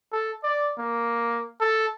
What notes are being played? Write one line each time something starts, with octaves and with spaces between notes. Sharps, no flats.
A4
D5
A#3
A4